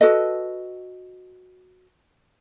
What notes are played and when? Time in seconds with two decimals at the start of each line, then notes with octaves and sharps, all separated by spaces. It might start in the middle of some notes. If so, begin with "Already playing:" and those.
0.01 F#4 A4 B4 D#5